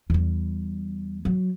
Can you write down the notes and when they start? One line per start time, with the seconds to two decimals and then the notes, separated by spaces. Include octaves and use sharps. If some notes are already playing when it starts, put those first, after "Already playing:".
0.10 E2 G3
1.25 F#3